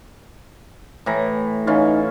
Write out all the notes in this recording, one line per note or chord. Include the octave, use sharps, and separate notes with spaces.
A2 E3 A#5
E3 C#4 D#4 F4